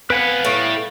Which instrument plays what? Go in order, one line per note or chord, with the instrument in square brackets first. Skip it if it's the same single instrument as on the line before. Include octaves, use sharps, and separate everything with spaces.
[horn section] B3 F5 [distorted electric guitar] C4 F#5 [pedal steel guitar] B4 G#5 B5
[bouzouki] A2 [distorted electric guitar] G3